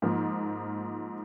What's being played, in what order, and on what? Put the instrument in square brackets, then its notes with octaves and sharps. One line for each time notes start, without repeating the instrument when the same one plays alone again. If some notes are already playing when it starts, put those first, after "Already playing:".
[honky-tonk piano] G#2 F3 A#3